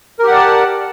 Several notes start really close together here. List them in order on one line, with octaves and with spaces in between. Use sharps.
A#4 G4 F#5 D5 A5